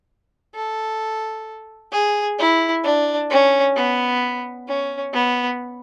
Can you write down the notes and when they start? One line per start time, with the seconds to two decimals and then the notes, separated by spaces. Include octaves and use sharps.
0.55 A4
1.92 G#4
2.39 E4
2.84 D4
3.29 C#4
3.75 B3
4.67 C#4
5.13 B3